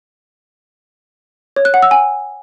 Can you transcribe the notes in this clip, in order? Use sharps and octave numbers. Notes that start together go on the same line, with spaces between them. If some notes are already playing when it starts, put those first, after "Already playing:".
C#5
F#6
F#5
E6
G#5